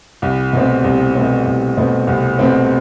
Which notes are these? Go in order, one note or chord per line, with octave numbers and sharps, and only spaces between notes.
C2
B2 A3 C4
C2
B2 A3 C4
C2
B2 A3 C4
C2
B2 A3 C4